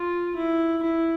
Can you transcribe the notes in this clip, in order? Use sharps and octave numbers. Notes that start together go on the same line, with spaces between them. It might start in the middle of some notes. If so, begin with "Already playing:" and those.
Already playing: F4
E4
E4